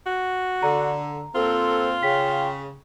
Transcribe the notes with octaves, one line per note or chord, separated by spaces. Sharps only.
F#4
D3 A#5
A#2 C4 F4 A4
C#3 G5 B6